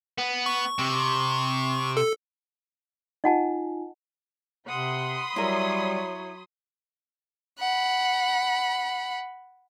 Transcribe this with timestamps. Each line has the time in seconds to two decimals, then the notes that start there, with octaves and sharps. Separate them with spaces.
0.18 B3
0.46 C#6
0.79 C3
1.97 A4
3.24 D#4 F4 D#5 F#5 G#5 A5
4.68 C3 F#5 B5 C6 D#6
5.36 F#3 G3 E4 A#4 C#5
7.59 F#5 B5